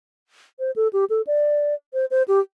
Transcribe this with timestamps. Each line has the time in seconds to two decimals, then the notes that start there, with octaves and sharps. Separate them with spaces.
0.59 C5
0.76 A4
0.93 G4
1.10 A4
1.27 D5
1.94 C5
2.11 C5
2.28 G4